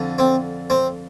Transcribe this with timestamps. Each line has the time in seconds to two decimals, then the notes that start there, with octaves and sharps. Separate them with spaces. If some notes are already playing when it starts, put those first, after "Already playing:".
Already playing: F2 D3
0.18 C4
0.70 C4